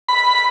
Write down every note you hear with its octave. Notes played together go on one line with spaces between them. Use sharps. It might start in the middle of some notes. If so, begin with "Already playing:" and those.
B5